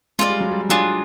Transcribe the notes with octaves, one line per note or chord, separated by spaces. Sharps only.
G#3 F4 A4 D5
G3
F#3
G3
F#3 D4 F4 G#4